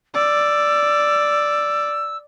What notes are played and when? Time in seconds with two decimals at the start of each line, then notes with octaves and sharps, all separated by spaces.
0.14 D5 E6